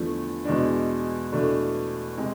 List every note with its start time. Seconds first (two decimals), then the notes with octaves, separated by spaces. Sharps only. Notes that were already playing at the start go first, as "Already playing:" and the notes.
Already playing: E2 D3 F3 A3
0.45 E2 B2 G#3 D4
1.32 E2 B2 A3 D4
2.17 C3 G#3